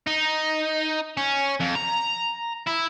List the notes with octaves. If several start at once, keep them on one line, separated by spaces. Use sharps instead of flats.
D#4
C#4
F2
A#5
E4